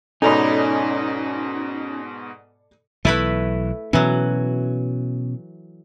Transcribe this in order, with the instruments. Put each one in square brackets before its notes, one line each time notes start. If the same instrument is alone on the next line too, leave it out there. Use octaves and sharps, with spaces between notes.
[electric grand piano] G#2 B2 G#5 [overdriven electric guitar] C#4 [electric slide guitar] D#4 [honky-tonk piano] A4 D5 B5
[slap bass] B1 E3 [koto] A3 E4 B4
[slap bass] B2 C#4 [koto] E3 F#3